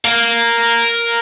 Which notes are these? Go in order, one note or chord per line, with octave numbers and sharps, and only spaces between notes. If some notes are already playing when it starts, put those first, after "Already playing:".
A#4 F5